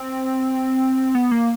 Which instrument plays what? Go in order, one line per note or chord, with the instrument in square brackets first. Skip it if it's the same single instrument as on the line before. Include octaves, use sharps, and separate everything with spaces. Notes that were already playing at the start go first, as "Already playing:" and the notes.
Already playing: [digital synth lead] C4
B3
A#3